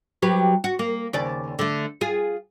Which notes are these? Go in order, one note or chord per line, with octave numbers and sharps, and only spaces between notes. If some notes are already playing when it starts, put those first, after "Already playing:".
F#3 G4 B4
F#4
A#3
D#2 C#3 D5
D3 A3
F4 G#4